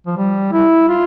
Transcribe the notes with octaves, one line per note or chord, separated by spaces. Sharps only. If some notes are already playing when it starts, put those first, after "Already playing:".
F3
G3
E4
F4